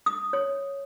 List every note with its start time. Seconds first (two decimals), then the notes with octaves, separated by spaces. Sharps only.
0.06 D#6
0.33 C#5